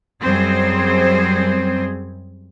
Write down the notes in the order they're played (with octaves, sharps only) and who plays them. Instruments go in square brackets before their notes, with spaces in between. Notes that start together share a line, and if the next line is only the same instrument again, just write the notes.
[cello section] F#2 G3 C4 G#4 C5